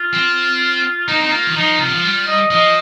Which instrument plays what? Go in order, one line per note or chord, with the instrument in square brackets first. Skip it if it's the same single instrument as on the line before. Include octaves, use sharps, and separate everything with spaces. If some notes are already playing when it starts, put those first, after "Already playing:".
Already playing: [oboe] F4
[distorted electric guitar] C4
[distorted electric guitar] A#3 [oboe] D#4
[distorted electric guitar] C4 [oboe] D#4
[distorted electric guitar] A#3 [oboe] F4
[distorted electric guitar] D#3
[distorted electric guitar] F3 [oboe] D#4
[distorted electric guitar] C3 [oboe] F4
[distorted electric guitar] D#3
F3
[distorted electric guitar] G3 [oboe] F4
[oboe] D#5
[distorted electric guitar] F3 [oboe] D#5